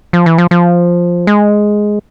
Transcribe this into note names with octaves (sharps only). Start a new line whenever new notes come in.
F3
E3
F3
F3
G#3